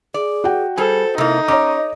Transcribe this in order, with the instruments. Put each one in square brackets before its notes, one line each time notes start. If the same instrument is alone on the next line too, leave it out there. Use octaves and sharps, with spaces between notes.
[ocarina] G#4 [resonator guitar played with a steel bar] D5
[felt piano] F#4 G5
[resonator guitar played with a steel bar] G3 G#4 [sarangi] A4 [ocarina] C5
[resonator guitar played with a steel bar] C3 A#3 [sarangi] D#4 [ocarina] E4
[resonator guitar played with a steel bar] C#4 [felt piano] C#5 A#5 D6 [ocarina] D#5